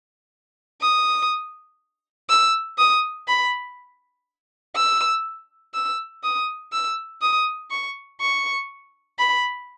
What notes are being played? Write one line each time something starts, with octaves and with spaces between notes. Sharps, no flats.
D#6
E6
D#6
B5
E6
E6
D#6
E6
D#6
C#6
C#6
B5